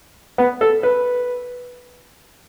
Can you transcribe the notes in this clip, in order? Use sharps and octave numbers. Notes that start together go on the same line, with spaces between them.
B3
A4
B4